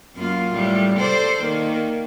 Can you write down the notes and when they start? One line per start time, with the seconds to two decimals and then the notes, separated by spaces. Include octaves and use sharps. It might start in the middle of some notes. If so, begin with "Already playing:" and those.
0.15 F#2 A#3 F4
0.54 A2 G3
0.99 A4 C5 D5
1.41 D#3 A#3